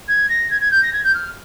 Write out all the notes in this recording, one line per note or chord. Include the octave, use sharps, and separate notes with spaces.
G#6
A#6
G#6
G#6
G6
A#6
G#6
G6
F6